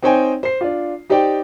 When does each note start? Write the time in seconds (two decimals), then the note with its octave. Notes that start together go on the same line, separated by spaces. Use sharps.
0.03 C4 D#4 C5 C#5 G5 G#5
0.43 C5 C7
0.61 D4 F4
1.10 D#4 G4 C5 D5 G5